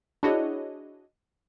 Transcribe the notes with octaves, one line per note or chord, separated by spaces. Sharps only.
D4 E4 F#4 G#4 C#5 D#5